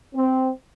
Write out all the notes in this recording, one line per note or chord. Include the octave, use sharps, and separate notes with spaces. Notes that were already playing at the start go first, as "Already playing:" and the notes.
C4